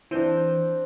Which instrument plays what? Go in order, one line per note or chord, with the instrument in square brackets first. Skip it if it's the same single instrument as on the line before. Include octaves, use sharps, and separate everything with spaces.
[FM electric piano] E3 G6 [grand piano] C4 D4